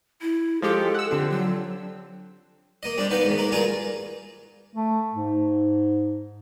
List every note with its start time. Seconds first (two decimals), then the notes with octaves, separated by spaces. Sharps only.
0.22 E4
0.62 F3 G#3 G4 A4
0.94 F#5 E6
1.11 D3 F3 C4 G4
1.30 F#3
2.83 A#3 D#5
2.97 G3 C4 D4
3.10 B3 D#4 B4 F5 G5
3.25 G#2 D#3
3.38 A#3 A#4
3.51 G2 F4 G#4 A#4 F5
4.76 A3
5.13 G#2